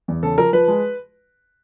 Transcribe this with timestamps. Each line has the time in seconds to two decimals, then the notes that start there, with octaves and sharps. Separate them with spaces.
0.08 E2
0.23 C#3 A4
0.38 F3 A#4
0.53 F3 B4
0.68 G#3